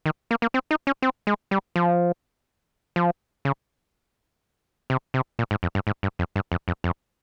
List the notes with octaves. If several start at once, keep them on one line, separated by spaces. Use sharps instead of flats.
D#3
A#3
A#3
C4
D#4
C#4
C4
G#3
G3
F3
F3
C#3
C3
C3
A#2
G#2
F2
G2
G#2
G2
F2
G2
F2
F2
F2